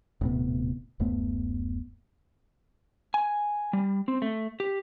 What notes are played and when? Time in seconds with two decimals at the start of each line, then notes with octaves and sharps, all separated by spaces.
0.21 D#1 A2 C3 B3
1.00 D1 F#2 A3 B3
3.14 G#5
3.73 G3
4.08 C4
4.22 A3
4.60 G4